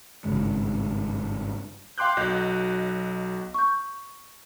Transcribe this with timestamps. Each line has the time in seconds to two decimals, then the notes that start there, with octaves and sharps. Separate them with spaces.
0.25 G#1 G2 C#3 G#3
1.98 F5 G5 C6 D6 F#6 G6
2.17 B1 F#3 D#5 F#6 G6
3.54 C#6 G6